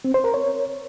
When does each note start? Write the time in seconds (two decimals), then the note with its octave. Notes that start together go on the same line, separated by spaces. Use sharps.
0.04 C4
0.14 C5
0.24 A#4
0.34 C#5